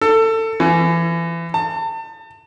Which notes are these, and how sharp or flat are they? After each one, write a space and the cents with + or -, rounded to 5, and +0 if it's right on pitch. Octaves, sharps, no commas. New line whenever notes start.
A4 +25
E3 +30
A5 +35